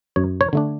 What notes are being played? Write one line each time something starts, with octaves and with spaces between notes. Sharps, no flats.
F#2 C#5
C#5
D3 A3 D4